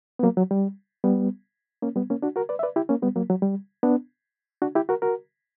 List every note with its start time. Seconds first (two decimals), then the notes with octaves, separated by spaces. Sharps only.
0.19 B3
0.23 F#3 A#3
0.37 F#3
0.51 G3
1.04 G3 B3
1.83 A#3 C#4
1.96 G3 B3
2.10 A#3 C#4
2.22 D4 F#4
2.36 F#4 A#4
2.49 B4 D5
2.59 E5
2.63 B4 D5
2.76 E4 G4
2.89 A#3 C#4
3.02 G3 B3
3.16 F#3 A#3
3.30 F#3
3.42 G3
3.83 B3 D4
4.62 D4 F#4
4.75 E4 G4
4.89 F#4 A#4
5.02 F#4 A#4